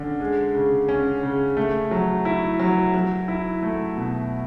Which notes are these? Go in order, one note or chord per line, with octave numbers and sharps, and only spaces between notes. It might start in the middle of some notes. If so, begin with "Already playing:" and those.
Already playing: D3 C#4
G#3
C#3
C#4
C#3
A3
F#3
E4
F#3
F#3
E4
A3
B2